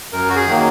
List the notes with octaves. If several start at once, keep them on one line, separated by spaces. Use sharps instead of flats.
F#2 A#4
F#4
G#4
D#3 F#3 A#3